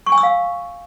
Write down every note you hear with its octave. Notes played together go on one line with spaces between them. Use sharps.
C#6
G#5
E6
F5